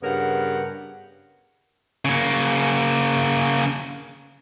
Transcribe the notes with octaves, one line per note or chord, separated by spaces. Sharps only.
G2 C#3 B3 A#4 F#5
C#3 A#3